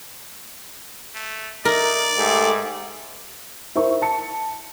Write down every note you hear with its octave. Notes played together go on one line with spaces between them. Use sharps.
A3
D#4 A#4 D5 E5
G#2 A3 G4 A4
E4 A#4 C5 C#6
A5 C#7